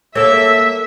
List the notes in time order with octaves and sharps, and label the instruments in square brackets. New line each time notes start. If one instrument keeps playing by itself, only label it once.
[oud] A#3 A4 [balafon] C#5 [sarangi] E5 [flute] E6